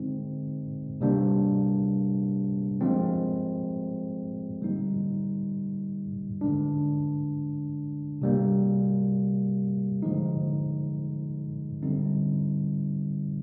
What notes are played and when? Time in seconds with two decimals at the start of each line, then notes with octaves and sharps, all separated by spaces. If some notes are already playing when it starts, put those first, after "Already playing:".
Already playing: D3 G#3 C4 D#4
1.01 C3 G3 A#3 D4
2.81 F3 G#3 C4
4.61 D3 G3 A#3 D#4
6.41 D3 G#3 D4
8.22 C3 G3 A#3
10.03 D3 F3 G#3 D#4
11.82 D3 G3 C4 D#4